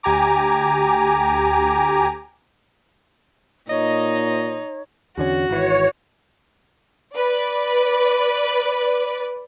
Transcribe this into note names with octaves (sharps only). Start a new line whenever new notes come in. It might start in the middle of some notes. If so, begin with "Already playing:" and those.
D2 G4 G#5 A#5 D6
A#2 D#4 C#5 D#5
E2 D3 C#4 F#4
G#1 E3 C#5
B4 D5